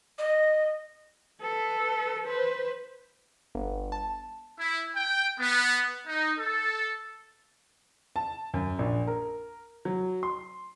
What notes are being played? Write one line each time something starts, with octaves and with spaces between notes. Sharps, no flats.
D#5
A4 B4
B4 C5
G1
A5
E4
G5
B3
D#4
A4
A5
F#2
A#1
A#4
F#3
C6